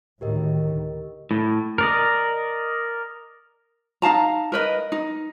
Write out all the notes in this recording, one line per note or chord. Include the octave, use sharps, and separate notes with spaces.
D2 A2 D#3 G4 A#4 D#5
A2
A#4 D5 D#5
D#4 F5 A5 A#5
A#4 B4 D#5
D#4